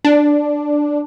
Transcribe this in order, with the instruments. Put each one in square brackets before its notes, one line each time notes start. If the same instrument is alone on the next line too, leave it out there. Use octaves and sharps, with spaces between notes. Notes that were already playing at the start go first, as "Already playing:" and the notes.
[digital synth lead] D4